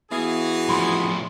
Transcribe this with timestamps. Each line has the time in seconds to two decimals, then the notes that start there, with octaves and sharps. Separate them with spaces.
0.12 E3 B3 F#4 G#4 E5
0.69 A2 F3 B5 C6